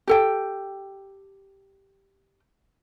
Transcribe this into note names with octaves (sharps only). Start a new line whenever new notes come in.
G4 A4 G5